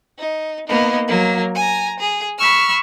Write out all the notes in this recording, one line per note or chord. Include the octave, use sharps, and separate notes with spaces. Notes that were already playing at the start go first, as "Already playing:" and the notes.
D#4
A#3 B3 D#4
F#3 A#3
G#5 A#5
G#4
B5 C#6 E6 F6